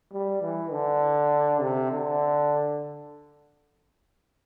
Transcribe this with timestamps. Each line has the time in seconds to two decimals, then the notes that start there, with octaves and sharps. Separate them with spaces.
0.12 G3
0.42 E3
0.72 D3
1.61 C3
1.91 D3